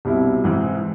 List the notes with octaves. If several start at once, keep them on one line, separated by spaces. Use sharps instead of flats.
C2 B2 G3 C4 E4
G#2 E3 G#3 C4 E4